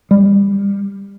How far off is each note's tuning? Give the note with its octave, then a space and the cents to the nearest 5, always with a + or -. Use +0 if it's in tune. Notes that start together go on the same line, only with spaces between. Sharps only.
G3 +25